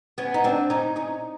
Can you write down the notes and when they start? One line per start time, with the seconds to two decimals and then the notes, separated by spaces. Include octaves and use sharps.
0.18 B3 C#4
0.34 D#4
0.44 C4 D4
0.70 C#4 D#4
0.96 C#4 D#4